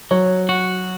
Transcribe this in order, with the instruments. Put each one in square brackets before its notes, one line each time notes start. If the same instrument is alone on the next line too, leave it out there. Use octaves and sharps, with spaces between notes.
[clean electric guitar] F#3 [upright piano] C#5
[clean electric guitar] F#4